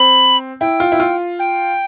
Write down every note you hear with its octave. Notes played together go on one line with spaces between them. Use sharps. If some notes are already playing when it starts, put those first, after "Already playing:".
Already playing: C4 B5
E4 G5
F4
E4
F4
G5